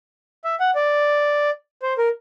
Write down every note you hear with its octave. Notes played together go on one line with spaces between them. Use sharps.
E5
F#5
D5
C5
A#4